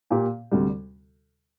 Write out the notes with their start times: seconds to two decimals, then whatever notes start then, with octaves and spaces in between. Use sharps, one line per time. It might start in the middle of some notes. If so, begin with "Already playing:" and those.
0.10 A#2 A#3 G4
0.52 D2 C3 G3